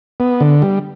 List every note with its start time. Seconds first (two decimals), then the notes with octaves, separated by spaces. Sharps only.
0.20 B3
0.40 D3
0.62 G3